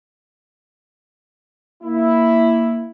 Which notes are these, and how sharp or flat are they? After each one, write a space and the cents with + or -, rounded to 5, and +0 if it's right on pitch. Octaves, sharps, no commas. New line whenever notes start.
A#3 +0 E4 +0